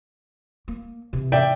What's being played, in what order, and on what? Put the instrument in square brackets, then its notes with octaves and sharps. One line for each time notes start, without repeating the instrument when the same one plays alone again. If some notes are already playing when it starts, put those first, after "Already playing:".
[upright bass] A#3
C3 E3
[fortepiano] D5 E5 G5